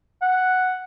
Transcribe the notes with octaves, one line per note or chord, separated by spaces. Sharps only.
F#5